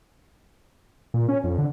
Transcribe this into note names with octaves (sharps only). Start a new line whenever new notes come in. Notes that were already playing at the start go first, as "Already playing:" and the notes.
A#2
C#4
F2
D3